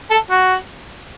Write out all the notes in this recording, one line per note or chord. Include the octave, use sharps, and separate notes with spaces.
A4
F#4